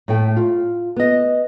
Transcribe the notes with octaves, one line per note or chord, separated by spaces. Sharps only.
A2 A3 G5
F4
B3 D#5